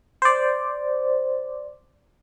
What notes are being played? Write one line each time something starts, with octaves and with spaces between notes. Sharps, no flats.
C5 D5